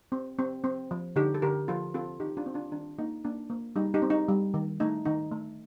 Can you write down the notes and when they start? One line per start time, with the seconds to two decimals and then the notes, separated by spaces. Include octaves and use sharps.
0.12 C4
0.39 C4
0.64 C4
0.91 F3
1.16 D3 D#4 G4
1.34 A4
1.42 D3 G4 A#4
1.68 F3 F4 A4
1.94 C4 F4 A4
2.20 D#3 D#4 G4
2.37 D4 F4
2.46 C4
2.54 D4 F4
2.72 D#3 D4
2.98 A#3 D#4
3.25 A#3 D4
3.50 A#3
3.76 G3 D#4
3.94 D#4 G4
4.02 C4
4.10 D#4
4.29 G3
4.54 D#3
4.80 A3 D#4
5.05 D#3 D#4
5.32 A3